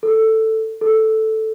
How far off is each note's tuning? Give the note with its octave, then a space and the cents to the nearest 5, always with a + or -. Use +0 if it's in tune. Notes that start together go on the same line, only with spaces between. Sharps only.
A4 +10
A4 +0